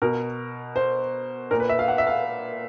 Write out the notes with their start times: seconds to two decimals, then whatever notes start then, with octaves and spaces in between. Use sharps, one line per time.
0.02 B2 A#4
0.76 C5
1.51 A#2 A#4
1.60 B4
1.69 E5
1.79 F5
1.88 F#5
1.98 E5
2.07 F5